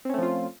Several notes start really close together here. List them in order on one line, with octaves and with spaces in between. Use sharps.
C4 C#4 A3 F3 F4